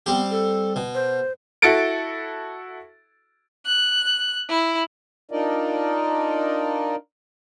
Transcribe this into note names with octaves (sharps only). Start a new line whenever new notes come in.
G3 B3 C4 G4
A4
B2
C5
E4 F#4 A4 A6 C#7 D7
F#6
E4
D4 D#4 F4 A#4 D5 D#5